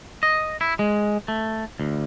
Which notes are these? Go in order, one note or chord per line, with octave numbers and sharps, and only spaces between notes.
D#5
E4
G#3
A3
D2